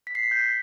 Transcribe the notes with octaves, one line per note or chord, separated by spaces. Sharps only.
B6
C7
B6
G6